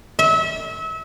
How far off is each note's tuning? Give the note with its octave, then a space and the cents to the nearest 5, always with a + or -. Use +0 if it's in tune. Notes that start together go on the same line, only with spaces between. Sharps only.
E5 -30